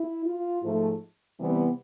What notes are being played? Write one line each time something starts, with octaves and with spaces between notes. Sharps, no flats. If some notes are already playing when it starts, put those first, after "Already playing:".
Already playing: E4
F4
G#2 F3 A3
C3 E3 G3 B3